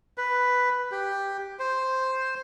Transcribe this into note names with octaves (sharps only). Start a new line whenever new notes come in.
B4
G4
C5